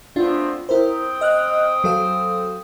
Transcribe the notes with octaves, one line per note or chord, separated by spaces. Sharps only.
A3 B3 C4 D4 F4
C4 E4 A#4 C5 G5 D#6
D#5 F6 F#6
F#3 A4 F5